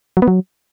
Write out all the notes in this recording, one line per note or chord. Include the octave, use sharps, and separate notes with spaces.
F#3
B3
F#3